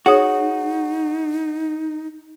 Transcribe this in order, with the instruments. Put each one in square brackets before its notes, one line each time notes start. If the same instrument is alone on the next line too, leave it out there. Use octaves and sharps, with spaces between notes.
[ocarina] D#4 [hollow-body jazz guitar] F#4 [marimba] G#4 C#5 D#6